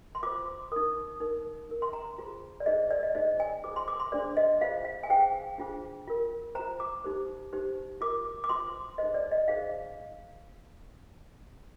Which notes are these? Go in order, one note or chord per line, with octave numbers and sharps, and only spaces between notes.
C6
F4 C5 D6
D#4 A#4 D#6
D#4 A#4
D#4 A#4
C6
A#5
F4 G#4 C5
D5
D#4 G#4 C5 D#5
D5
D#5
D#4 G#4 C5 D#5
G#5
F4 G#4 C5 D6
C6
D6
C6
D4 G#4 C5 D5
D#5
F4 G#4 C5 F5
F5
G#5
D#4 G#4 C5 G5
D4 F4 G#4 C5
F4 A#4
F4 C5 A#5
D6
D#4 G4 C5
D#4 G4 C5
F4 A#4 D6
D6
F4 C5 C6
D#4 G#4 C5 D#5
D5
D#5
D#4 G#4 C5 F5